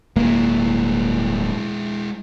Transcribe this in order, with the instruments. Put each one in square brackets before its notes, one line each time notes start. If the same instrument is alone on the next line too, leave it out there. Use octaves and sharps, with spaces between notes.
[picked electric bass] D1 A#3 [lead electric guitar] G#3 E4